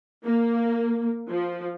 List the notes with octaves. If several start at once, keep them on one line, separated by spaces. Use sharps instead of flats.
A#3
F3